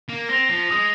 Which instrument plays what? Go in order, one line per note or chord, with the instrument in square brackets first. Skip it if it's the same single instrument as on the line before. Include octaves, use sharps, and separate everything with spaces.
[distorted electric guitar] A#3
[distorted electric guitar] C4 [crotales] A#6 F7
[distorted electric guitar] F3
[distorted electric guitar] G#3 [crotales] D#6